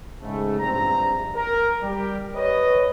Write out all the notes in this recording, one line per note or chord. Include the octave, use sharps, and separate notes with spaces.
G#2 C#3 A3
A#1 G2 C3 C4 A#5
A#4
G3 G4
B4 C#5 D#5